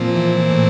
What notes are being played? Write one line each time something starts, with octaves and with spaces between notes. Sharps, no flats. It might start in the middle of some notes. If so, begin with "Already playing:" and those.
Already playing: A#2 F3 C4
E3
A2